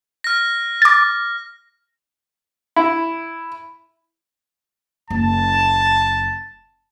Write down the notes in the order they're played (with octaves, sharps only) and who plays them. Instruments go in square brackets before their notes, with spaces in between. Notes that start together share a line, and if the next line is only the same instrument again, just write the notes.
[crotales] F6 A#6
[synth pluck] D6 A6
[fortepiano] E4
[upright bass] F#1 [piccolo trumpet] A5